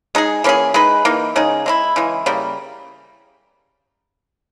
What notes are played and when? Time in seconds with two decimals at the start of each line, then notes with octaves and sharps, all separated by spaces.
0.15 G#3 D#4 G#4
0.44 E3 A#3 C#4 G#4
0.74 G#3 D#4 G#4 B4
1.05 E3 A#3 D#4
1.36 C#3 G#3 D#4 G#4
1.66 G#3 C#4 E4
1.96 C#3 E3 G#3
2.26 C#3 G3 A#3